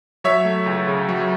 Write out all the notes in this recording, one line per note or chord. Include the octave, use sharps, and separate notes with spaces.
F#3 C#5 E5
A3
C#2
C#3
F#3